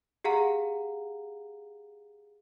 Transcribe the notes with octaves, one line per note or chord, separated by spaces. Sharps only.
G4 G#4 F5 F#5 A#5